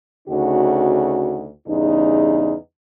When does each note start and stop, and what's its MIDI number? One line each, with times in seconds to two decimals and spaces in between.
0.28 1.49 38
0.28 1.49 49
0.28 1.49 63
0.28 1.49 66
1.67 2.54 40
1.67 2.54 43
1.67 2.54 49
1.67 2.54 63